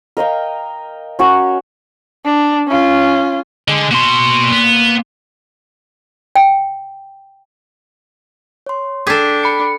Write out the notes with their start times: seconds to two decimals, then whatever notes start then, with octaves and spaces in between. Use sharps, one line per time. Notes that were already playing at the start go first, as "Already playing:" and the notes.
0.17 A#4 D#5 F5 G5
1.19 C#4 F#4 A#4 C#5
2.25 D4
2.68 C#4 F4
3.68 D3 G#4 D#5
3.91 B2 A#3 F#4 C6
4.52 B3
6.36 G5
8.66 C#5 C6
9.07 D4 G#4 A4 G5 D6 G6 B6
9.43 B5 C#7